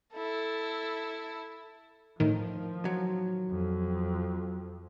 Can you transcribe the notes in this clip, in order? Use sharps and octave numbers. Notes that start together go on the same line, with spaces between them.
E4 A4
A2 D#3 F3
F#3
F2